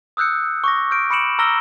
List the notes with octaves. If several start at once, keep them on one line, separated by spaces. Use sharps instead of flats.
D#6 E6 F#6 G6 C#7
C#6 D6 A#6
F6 G6 D7
B5 D6 C#7 D7 E7 F#7
A#5 E6 F6 A#6 G7